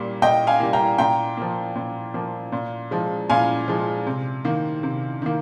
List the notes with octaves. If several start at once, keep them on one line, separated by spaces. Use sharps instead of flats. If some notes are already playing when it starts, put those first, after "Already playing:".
Already playing: A#2 G3 A#3
A#2 D#5 G5
F5 G#5
G3 A#3
G5 A#5
A#2 G5 A#5
F3 A#3
A#2
F3 A#3
A#2
F3 G#3
A#2 F5 G#5
F3 G#3
C3
D#3 A#3
C3
D#3 A#3